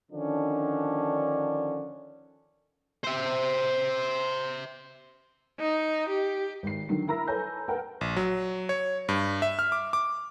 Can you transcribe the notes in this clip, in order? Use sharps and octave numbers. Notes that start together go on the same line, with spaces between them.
D3 D#3 F3 C#4 D4
C5 E5
D#4
G4
G#1 C7
D3 D#3 F#3 C7
E4 A#4 A#5 B5 E6 A#6
A4 B4 C#5 G#5 A#5 G6
A#4 B4 F#5 G5 A5
A#1
F#3
C#5
G2
E5
F6
D6
D6